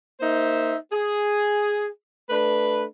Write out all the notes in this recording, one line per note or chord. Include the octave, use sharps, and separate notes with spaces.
A#3 D#4 C5 E5
G#4
A3 D4 B4